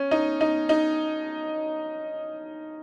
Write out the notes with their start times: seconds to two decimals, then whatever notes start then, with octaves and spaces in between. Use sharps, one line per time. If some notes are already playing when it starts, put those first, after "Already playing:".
Already playing: C#4
0.11 D#4
0.41 D#4
0.69 D#4